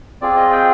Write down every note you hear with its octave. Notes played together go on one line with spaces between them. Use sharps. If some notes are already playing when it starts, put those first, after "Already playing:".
C4 F4 G#4 D5
D#5
G5